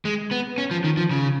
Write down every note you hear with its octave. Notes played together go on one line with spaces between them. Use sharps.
G#3
B3
C#4
F3
D#3
F3
C#3